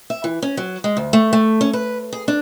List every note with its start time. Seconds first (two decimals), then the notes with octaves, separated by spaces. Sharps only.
0.10 E5
0.24 E3
0.42 C#4
0.57 F#3
0.84 G#3
0.97 D2
1.13 A3
1.33 A3
1.61 C#4
1.73 B4
2.13 G#4
2.28 D4